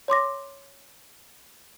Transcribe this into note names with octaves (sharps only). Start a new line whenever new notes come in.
C#5 C6 D6 A#6